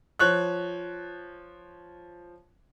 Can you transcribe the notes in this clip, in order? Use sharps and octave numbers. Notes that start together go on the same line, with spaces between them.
F3 C#5 F#6